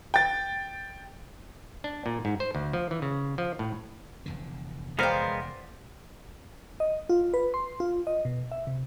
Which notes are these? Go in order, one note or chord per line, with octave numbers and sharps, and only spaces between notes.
G5 A6
D4
A#2
G#2
C5
D2
F3
E3
C#3
F3
A2
F1 E2 D3
G#3 B3 A#4 C5 D5 F5 G5
D#5
F4
B4
C6
F4
D#5
B2
E5
C3